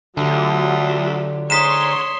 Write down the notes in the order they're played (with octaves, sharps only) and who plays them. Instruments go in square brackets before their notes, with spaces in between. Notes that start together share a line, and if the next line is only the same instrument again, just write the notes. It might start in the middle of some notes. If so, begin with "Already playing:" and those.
[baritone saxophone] D2 [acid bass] D3 [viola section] F#3 F4 G4
[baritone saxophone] G#2 [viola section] C#5 C6 [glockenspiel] D#6 B6 E7